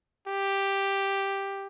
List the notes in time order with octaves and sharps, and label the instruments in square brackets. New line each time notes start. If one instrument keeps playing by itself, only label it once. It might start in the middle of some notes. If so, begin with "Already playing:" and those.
[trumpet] G4